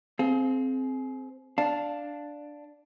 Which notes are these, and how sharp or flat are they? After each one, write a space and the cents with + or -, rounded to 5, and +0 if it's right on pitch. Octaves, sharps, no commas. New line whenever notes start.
C4 +0 G#4 +35 F5 +0
D4 +0 F5 +0 A5 +0